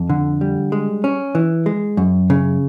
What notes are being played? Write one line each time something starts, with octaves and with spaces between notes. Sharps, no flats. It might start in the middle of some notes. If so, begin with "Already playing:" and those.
Already playing: F2
D3
G3
G#3
C#4
E3
G#3
F#2
C#3